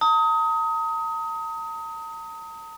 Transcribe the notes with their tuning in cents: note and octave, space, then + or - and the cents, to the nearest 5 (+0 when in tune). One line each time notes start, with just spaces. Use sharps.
A#5 -45 D#6 +25